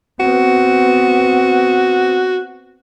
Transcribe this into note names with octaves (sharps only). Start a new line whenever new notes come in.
B3 C4 F#4